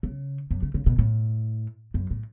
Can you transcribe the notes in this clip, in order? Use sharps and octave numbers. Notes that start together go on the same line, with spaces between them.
C#3
F#2
C#3
C#3
B2
A2
F#2
A2